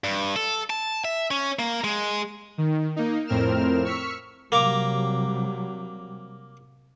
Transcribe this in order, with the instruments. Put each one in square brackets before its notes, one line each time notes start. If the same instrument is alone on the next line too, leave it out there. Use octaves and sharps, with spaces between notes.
[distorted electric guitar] G2
A4
A5
E5
C#4
A#3
G#3
[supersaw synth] D#3
A#3 D#4
F2 A2 C4 A#4 F6 E7
C#6 E6 F6 B6 C#7
[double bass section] C3 F#3 G3 [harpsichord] A#3 A#5 D6